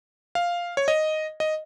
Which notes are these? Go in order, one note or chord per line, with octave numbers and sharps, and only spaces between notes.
F5
C#5
D#5
D#5